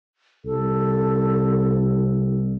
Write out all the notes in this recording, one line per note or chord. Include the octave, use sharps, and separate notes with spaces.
C2 A4